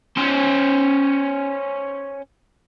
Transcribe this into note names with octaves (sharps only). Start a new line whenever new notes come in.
C#4 C5